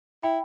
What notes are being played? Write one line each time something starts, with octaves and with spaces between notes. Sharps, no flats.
E4 G5 B5